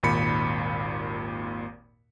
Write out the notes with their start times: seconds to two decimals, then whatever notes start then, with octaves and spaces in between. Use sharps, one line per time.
0.03 G#1 D#2 A#2 B5 C#7